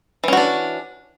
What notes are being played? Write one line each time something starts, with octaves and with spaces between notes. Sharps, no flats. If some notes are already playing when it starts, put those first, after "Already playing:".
E3 C#4 D4 F#4